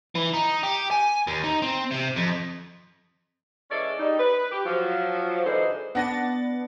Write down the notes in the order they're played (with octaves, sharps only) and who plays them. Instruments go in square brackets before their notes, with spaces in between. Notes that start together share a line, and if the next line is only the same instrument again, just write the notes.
[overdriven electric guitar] E3
D#4
G4
G#5
D#2
D#4
C4
C3
F2
[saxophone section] E3 G#3 C#4 A4 C#5 D5
G3 D#4
B4
G4
F3 F#3
G#2 D3 E3 G#3 D#4 C5
[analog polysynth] B3 D4 A6 [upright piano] F#5 A#6